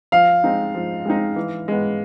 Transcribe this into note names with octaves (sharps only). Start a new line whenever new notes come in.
F3 F5
G#3 C4 D#4
F3
G#3 C4 D#4
E3
G#3 B3